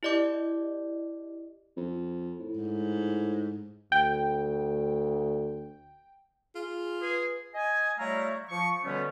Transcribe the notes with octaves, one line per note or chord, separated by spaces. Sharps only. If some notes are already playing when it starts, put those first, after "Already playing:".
E4 G4 D5 D#5 D6
F2
A2
G#2
D2 G5
F4 G#4
G#4 B4
D#5 G#5
F#3 G3 A3 E4 F5 A#5
F3 C#6
B2 D3 G3 A3 B3 C#4